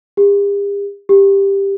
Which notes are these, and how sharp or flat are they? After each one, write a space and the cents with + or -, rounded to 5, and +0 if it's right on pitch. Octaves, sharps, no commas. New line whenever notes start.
G4 +45
G4 +10